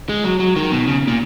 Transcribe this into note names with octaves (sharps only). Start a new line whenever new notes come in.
G#3
F#3
F#3
D#3
B2
C#3
A#2